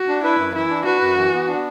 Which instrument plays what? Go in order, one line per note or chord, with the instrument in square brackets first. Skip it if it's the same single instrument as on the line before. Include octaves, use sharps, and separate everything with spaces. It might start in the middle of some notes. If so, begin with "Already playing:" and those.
Already playing: [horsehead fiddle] F#4
[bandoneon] D4
[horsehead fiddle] E4 [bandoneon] B4
[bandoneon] F#2
[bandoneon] E3 [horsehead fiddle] E4
[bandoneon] D4
[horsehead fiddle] F#4 [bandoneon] B4
[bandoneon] F#2
E3
B3
D4